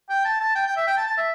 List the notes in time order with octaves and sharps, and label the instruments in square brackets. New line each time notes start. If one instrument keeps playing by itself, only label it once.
[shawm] G5
A5
A5
G5
G5
E5
G5
A5
A5
E5